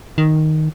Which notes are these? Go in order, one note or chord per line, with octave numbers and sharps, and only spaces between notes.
D#3